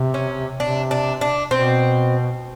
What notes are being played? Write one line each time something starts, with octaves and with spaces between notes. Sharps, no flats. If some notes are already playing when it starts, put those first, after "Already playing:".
Already playing: C3
C#4
C3 D4
D4
D4
B2 C4